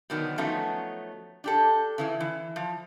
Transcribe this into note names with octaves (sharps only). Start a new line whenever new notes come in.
B2 D3 D#3 F#3 B3
F3 F#3 A3 B3 C#4 D#4
D4 G4 A4
C#3 E3 E4
E3
F3